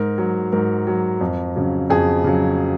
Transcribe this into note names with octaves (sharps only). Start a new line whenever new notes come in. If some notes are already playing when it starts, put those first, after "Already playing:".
Already playing: G#2 A#4
F#3
G#2 A#4
F#3
F2
C#3 F#3
F2 G#4
C#3 F#3